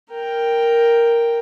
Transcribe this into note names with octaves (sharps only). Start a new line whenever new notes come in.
A#4 G5